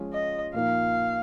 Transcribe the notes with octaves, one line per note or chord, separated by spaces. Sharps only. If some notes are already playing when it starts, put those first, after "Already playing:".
Already playing: F3 G#3 C#4 F4
D#5
A#2 F3 A#3 D#4 F5